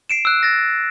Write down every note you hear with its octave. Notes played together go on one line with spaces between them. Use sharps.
C7 D7 E7
E6 F#6
A6 A#6